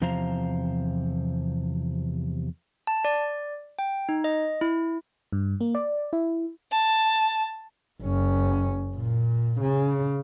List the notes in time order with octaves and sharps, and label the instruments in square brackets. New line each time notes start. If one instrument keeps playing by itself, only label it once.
[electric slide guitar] E2 C3 F3 C5 F5 A#5
[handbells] A5
D5
G5
D#4
D#5
E4
[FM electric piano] G2
A#3
D5
E4
[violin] A5
[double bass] F#1 C#4
A#2
C#3